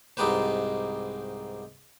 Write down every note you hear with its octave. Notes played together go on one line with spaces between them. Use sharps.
C2 G#2 D#4 G4 B4 C5